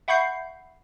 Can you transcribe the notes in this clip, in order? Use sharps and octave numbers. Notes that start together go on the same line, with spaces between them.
E5 F#5 B5 C#6 G6 C7